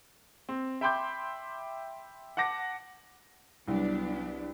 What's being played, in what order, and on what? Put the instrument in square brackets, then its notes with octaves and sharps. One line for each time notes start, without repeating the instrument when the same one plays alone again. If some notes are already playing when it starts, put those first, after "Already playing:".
[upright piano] C4
E5 G5 B5 C6 D6 G6
F#5 A5 D6 A#6
[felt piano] C2 [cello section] F#3 B3 D4